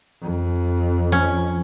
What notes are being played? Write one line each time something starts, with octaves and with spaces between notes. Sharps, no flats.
F2
F3 C#4